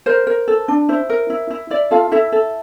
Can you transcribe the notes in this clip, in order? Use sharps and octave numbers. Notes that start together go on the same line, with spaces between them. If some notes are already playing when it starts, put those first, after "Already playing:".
A#4 C5
A#4
A4
D4
E4 C5
A#4
E4
E4
E4 D5
F4 A4 F5
E4 A4 E5
A4